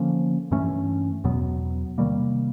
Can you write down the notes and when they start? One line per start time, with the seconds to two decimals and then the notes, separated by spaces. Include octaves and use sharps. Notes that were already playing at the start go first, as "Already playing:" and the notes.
Already playing: D3 F3 A#3 C#4
0.51 G2 E3 A3 C#4
1.24 E2 B2 F#3 B3
1.98 C3 D#3 G3 A#3